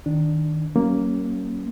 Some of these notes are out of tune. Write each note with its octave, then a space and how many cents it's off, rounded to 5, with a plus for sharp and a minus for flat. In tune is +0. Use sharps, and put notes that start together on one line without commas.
D#3 +0 D4 +0
F#3 +40 A#3 +0 C#4 +0